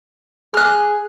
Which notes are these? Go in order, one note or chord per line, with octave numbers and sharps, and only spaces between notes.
G#4 F6 F#6